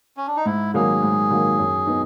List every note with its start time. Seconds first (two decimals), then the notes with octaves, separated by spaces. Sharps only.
0.17 C#4
0.27 D4
0.36 D#4
0.45 G#2 E4
0.74 D#3 F#3 A#3 G#4
1.02 G#2
1.31 D#3 F#3 A#3
1.59 F#2
1.87 B3 D#4